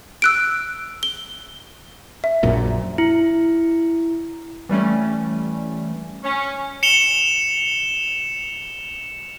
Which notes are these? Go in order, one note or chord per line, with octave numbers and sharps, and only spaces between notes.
E6 F#6 D7
G7
E5
A#1 F#2 A#2
E4
E3 G3 A3 C#4
C#4
C#7 E7 F7 G7